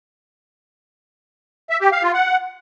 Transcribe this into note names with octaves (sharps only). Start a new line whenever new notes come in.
E5
G4
F5
F4
F#5